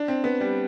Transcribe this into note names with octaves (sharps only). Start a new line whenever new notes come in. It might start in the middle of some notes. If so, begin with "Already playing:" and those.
Already playing: D4
C4
B3
G3